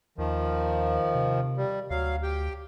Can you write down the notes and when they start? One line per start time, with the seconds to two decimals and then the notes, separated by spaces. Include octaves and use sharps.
0.18 D#2 D#3 F3
1.15 C3
1.57 G3
1.90 D2 F#3 F5
2.23 G4 G5